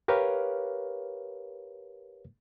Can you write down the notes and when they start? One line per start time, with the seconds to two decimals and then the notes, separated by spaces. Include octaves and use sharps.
0.08 G4 A#4 B4 C#5 F5